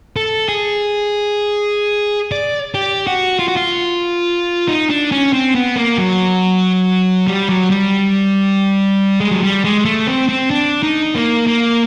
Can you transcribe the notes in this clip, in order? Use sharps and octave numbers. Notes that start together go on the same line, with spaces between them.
A4
G#4
D5
G4
F#4
F4
F#4
F4
D#4
D4
C#4
C4
B3
A#3
F#3
G3
F#3
G3
G#3
F#3
G3
G#3
A3
C4
C4
D4
D#4
A#3
A#3